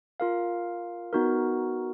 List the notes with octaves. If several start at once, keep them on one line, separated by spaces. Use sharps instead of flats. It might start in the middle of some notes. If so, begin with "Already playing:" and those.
F4 A#4 F5
B3 D#4 F#4 A#4